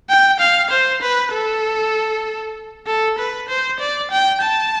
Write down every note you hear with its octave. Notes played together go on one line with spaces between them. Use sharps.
G5
F5
C5
B4
A4
A4
B4
C5
D5
G5
A5